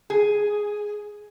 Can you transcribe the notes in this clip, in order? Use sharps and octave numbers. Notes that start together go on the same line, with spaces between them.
G#4